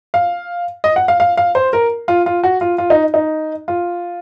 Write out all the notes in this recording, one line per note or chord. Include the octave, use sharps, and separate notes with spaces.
F5
D#5
F#5
F5
F5
F5
C5
A#4
F4
F4
F#4
F4
F4
D#4
D#4
F4